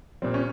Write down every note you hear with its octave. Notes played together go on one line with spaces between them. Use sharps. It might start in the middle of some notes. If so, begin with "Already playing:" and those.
A#2 G3 C4
C#4